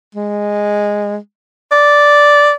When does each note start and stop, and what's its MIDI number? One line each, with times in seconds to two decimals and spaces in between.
0.15 1.17 56
1.72 2.52 74